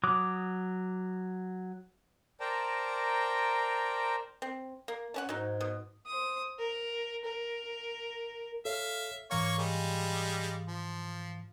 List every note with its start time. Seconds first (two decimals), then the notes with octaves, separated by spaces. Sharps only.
0.04 F#3 D6 D#6
2.40 A#4 C5 D5 G5 A5 A#5
4.42 C4
4.88 A#3
5.14 A3 C#4 F#5
5.29 G#2 F#3 D#4
5.61 B2
6.06 C5 D#6
6.59 A#4
7.25 A#4
8.65 A4 C#5 E5 F5
9.31 G#2 E3 A#3 C#5 F5 C#6
9.58 G3 G#3
10.69 F3